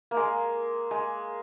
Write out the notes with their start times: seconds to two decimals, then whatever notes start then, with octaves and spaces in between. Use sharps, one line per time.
0.11 A#3
0.17 G#3
0.91 G#3